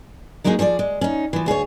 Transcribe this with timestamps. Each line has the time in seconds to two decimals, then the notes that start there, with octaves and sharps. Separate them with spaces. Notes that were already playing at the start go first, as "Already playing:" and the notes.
0.44 F#3 G#3 A#3 C#4 D#4 G#4
0.59 F3 G#4 C#5 D5
0.79 G#3
1.01 C#4 D#4
1.33 E3 F3
1.46 D2 G#4 B4 C#5